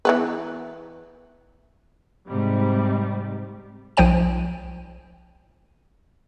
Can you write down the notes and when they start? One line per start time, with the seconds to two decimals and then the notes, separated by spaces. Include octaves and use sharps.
0.05 E3 B3 B4
2.29 G#2 C3 G3
3.97 B1 F3 F4 C5 G5 D#7